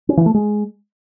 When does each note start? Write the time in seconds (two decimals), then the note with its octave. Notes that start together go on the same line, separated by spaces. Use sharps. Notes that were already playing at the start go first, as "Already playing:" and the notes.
0.09 C#4
0.17 E3
0.26 A3
0.34 G#3